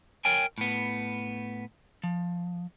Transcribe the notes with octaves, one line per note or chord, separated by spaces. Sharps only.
A#4 C#5 G5 G#5
A2 B3
F3